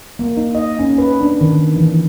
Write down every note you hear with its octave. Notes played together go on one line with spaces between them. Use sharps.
A#3
D#4
D#5
C#4
B4
D4
D#3
E3